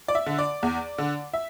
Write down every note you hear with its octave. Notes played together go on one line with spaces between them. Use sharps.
D5
E5
D3
D5
E2
D3
E5